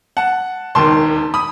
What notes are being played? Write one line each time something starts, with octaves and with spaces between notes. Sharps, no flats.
F#5 A5
E1 D#2 D#3 A5 C6
B5 D#6